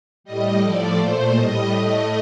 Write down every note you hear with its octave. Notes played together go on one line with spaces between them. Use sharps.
A2 G3 D#5
A2 F3 A3 D5
A#2 A3 C5
A2 G3 D#5
A2 A3 D#5